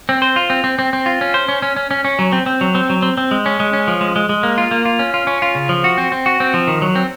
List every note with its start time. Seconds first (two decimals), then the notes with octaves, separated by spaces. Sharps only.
0.09 C4
0.22 C5
0.36 F4
0.50 C4
0.64 C4
0.79 C4
0.93 C4
1.06 F4
1.21 C#4
1.34 C5
1.48 C#4
1.62 C#4
1.76 C#4
1.91 C#4
2.05 C#4
2.19 F#3
2.32 C4
2.46 C4
2.61 F#3
2.75 C4
2.90 F#3
3.02 C4
3.17 C4
3.31 G#3
3.46 C#4
3.60 G#3
3.73 C#4
3.88 F3
4.01 G#3
4.16 G#3
4.29 G#3
4.43 A#3
4.58 F4
4.71 A#3
4.85 F4
4.99 C#4
5.14 F4
5.27 C#4
5.42 F4
5.55 C#3
5.69 F3
5.84 F#4
5.98 C4
6.12 C4
6.26 F#4
6.40 C4
6.54 F3
6.68 D#3
6.82 F#3
6.95 C4